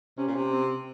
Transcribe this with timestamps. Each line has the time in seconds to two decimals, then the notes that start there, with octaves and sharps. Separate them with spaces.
0.17 C3 C#4
0.27 A#2
0.36 C3
0.53 C4